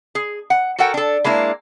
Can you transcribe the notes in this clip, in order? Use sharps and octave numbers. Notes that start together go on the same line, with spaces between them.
G#4
F#5
F#4 A4 A#4 F#5 G5
D4 A4
G#3 A#3 D4 E4